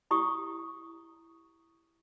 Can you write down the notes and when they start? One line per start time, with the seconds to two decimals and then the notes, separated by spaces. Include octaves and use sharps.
0.11 E4 G4 C#6 D#6